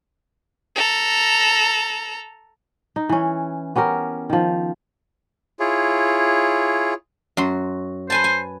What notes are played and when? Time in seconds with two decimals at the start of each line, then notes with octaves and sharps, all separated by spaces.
0.76 A4 A#5
2.96 D#4
3.09 E3 C#4
3.76 B3 C#4 G4 A#4
4.30 D#3 F3
5.60 E4 F4 G#4 C#5
7.37 F#2 F#4 C6
8.10 B4 C5 G#5 A5
8.24 G#5